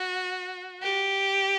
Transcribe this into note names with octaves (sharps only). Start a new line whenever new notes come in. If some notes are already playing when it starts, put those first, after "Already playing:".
Already playing: F#4
G4